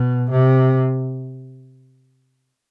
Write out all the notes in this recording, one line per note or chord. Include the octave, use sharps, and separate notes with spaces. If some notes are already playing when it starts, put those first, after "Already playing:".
Already playing: B2
C3